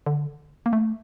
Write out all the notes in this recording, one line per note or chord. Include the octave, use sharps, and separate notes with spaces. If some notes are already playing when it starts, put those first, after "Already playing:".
D3
A#3
A3